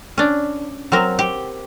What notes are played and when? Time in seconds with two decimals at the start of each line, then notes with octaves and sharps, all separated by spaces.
0.18 C#4 D4
0.92 F#3 C4 A#4
1.19 G4